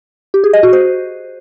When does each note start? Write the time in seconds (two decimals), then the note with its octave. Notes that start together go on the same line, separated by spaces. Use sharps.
0.34 G4
0.44 G#4
0.53 D#5
0.63 F#4
0.73 C5